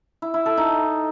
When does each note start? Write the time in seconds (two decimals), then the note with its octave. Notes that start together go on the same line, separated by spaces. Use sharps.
0.22 E4
0.34 E4
0.46 A4
0.57 D#4